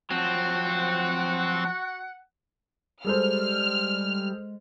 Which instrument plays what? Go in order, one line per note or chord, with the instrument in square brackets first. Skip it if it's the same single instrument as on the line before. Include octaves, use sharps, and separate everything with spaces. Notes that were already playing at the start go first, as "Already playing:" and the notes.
[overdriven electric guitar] F3 F#3 [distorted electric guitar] C4 [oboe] F#4 [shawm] F#5
[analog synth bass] G3 [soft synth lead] G#3 [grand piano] G#4 A4 C5 [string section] F6